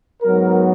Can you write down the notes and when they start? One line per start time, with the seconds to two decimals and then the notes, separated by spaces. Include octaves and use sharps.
0.23 G#2 F#3 B3 A#4